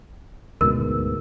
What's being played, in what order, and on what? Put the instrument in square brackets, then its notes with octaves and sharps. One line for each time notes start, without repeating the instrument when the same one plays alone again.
[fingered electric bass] D2 G#2 B2 [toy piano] A#4